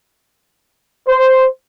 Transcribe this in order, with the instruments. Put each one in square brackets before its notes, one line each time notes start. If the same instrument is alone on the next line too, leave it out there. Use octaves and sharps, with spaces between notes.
[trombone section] C5